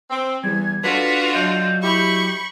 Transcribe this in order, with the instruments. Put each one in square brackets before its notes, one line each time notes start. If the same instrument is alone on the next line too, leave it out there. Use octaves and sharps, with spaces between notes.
[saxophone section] C4
[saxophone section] E2 [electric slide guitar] G3 [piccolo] G#6
[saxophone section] D4 [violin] F4 F#4 [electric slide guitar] A4 B4 [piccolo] B6
[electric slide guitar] F#3 D5 D#5 [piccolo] G6
[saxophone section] E4 G4 [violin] B5 C#6